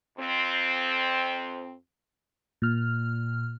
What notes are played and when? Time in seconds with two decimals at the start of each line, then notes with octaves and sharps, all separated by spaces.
0.18 F2 C4
2.62 A#2 F6